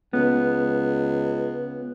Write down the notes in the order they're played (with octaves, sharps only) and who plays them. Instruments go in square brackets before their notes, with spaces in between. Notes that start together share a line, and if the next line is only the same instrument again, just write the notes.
[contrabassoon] C#2 [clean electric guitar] B3